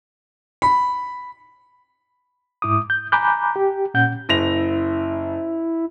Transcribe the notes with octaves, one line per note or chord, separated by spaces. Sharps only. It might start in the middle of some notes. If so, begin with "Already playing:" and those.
B5
G#2 E4 D6 D#6
G6
G#5 A#5 B5 D6 F#6 G6
G4
A#2 C#4 F#5 G6
F#1 E4 A#6 F7